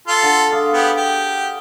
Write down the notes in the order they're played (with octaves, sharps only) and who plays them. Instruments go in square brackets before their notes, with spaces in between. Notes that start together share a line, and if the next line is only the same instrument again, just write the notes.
[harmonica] F4 A4
[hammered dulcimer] D3
G#4 D5 F5
[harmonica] B3 G4
G4